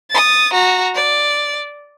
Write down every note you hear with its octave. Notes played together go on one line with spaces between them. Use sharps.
D#6 A6
F#4 A#5
D5